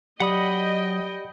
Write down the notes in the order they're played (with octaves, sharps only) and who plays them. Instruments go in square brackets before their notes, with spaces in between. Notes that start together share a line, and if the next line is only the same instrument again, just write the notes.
[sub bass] F#3 [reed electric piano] G4 D5 [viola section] D#5 G5 [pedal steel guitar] F#5 B5 D#6